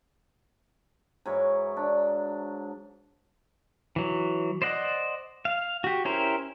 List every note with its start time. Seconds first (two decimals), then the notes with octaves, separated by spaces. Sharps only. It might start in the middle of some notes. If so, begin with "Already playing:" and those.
1.25 G#2 E3 F#3 C#5
1.77 D4
3.96 E3 F#3
4.62 C5 D5 D#5 F#5
5.45 F5
5.84 F#4 G4
6.05 C#4 E4 G4 A#4 C5